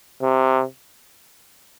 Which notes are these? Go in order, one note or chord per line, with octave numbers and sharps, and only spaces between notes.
C3